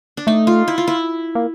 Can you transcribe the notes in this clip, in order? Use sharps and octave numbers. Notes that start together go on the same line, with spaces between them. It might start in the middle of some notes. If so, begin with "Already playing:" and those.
D4
A3 D#4
F4
E4
F4
E4
A#3